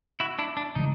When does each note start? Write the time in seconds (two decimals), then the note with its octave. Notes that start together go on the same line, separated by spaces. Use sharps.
0.20 E4 F#4
0.39 D4 E4
0.57 D4
0.75 C#3 E3 G#3 D#4